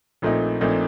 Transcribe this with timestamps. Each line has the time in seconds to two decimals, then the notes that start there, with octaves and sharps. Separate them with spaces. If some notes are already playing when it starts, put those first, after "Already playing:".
0.22 A#1 A#2 A3 C4 D#4
0.61 A#1 A#2 A3 C4 D#4